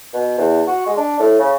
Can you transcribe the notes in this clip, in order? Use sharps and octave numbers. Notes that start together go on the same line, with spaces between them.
B2
E2
F#4
G#3
D4
A2
C#3